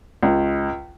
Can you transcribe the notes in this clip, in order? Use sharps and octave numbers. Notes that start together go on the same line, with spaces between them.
C#2